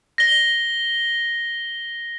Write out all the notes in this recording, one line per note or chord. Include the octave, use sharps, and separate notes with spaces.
A#6 G7